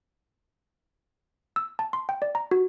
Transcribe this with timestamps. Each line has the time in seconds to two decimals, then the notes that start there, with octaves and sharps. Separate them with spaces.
1.56 E6
1.79 A5
1.93 C6
2.09 G5
2.22 D5
2.35 A#5
2.51 F#4